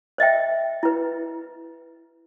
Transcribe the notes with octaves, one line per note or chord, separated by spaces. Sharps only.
C5 D#5 E5 G5
E4 B4